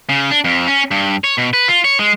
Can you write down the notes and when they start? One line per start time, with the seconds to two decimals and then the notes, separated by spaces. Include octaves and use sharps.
0.09 C#3
0.31 D4
0.44 F2
0.67 C#4
0.91 G2
1.24 C#5
1.38 B2
1.53 B4
1.68 F4
1.84 C#5
1.99 G#3